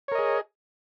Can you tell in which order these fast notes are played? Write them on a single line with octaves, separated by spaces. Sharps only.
C#5 A#4 D#5 G#4